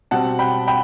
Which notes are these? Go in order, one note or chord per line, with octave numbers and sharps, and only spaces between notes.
B2 G3 C4 F#5 A5
G5 B5
G5 B5